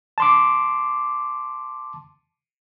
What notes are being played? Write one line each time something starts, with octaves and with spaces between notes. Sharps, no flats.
A5 C6 D6